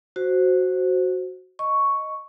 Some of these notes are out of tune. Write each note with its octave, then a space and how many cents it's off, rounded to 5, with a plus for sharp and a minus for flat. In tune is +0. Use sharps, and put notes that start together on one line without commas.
F#4 +0 C5 +0
D#5 +0 C#6 +5